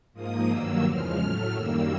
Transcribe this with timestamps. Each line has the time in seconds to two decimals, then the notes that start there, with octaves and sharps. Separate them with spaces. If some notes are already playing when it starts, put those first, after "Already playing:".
0.13 G#2 F3 A#3 D#6
0.48 G2 D#3 F#3 A#3 E6
0.83 E2 C#3 F3 G#3 F6
1.18 A2 F#3 A3
1.53 F#2 D#3 G3 A#3 E6